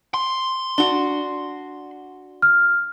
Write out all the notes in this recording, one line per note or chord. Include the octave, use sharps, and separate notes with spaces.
C6
D4 F#4 G7
F6